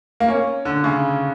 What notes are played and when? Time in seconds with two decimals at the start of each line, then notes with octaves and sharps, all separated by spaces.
0.20 A#3
0.28 C#4
0.65 D3
0.84 C#3